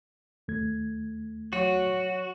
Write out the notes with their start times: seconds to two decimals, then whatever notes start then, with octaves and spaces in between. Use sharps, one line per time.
0.48 D#2 A3 G#6
1.53 F#3 F#4